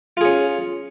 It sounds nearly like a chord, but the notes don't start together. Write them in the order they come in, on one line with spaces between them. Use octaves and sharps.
F4 G#4 C#4